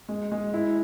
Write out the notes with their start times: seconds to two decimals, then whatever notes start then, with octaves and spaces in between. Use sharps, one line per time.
0.08 G#3
0.32 G#3
0.54 E4